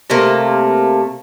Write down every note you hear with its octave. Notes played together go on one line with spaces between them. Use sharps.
C3 A3 A#3